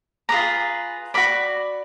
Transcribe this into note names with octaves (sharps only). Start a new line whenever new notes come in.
F4 G#4 B4 D5 A#5
F#4 A#4 D5 B5